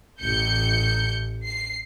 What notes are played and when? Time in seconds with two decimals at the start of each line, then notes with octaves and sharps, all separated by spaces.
0.19 A1 G6 C#7
1.44 C7